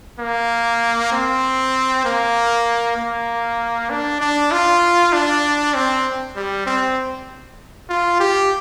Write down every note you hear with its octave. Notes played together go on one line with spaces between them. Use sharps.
A#3
C4
A#3
A#3
D4
D4
F4
D4
C4
G3
C4
F4
G4